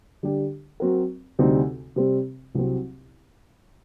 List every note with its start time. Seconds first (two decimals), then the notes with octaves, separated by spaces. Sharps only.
0.23 D3 G3 D4 G4
0.80 F#3 C4 F#4 A#4
1.39 D2 C3 G3 C4 D#4
1.96 C3 G3 C4
2.55 C2 C3 F#3 C4